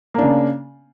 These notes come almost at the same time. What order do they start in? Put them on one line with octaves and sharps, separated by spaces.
A#3 D4 C#3